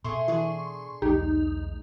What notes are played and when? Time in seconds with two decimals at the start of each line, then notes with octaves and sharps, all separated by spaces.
0.04 B2 A3 G#4 C6 C#6
0.28 E3 D4 G#4
1.02 B1 E2 A3 D#4 G4